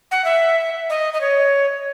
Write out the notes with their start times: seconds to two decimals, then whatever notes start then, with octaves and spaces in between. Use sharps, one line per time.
0.11 F#5
0.24 E5
0.90 D#5
1.13 D#5
1.21 C#5